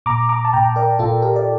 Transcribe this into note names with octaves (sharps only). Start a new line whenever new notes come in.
A#2 A#5 D6
A#5 D6
A5
A#2 G5 A#5
A#4 D5
A#2 F4 A4
G4 A#4
D5